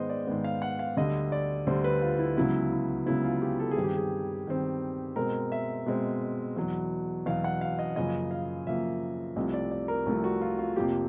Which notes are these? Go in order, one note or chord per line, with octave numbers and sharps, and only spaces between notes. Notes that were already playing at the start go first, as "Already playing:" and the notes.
Already playing: G#2 D#3 G#3 B3 C5 D#5
D5
G#2 D#3 G#3 B3
F5
F#5
F5
D2 D3 G3 D#5
D5
D2 D3 G3 C5
B4
F4
E4
C#2 C#3 F#3 B3 E4
E4
C#2 C#3 F#3 B3 E4
F4
G4
A4
G#4
G2 D#3 G3 C4
G4
G#4
G2 D#3 G3 C4
B2 G#3 C4 A#4
E5
B2 G#3 C4
E2 B2 F#3
E2 B2 F#3 F5
F#5
F5
D#5
F#2 C#3 F3 A#3 D#5
F5
F#2 C#3 F3 A#3 E5
C2 C3 F3 A3 D#5
D5
D5
A#4
C2 C3 F3 A3
F#4
F4
F4
F2 C3 F3 A#3 G4